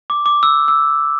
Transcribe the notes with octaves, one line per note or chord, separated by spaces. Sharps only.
D6
D6
E6
E6